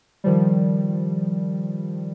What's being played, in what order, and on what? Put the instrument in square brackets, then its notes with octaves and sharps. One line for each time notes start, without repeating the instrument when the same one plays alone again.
[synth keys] D#3 F3 G3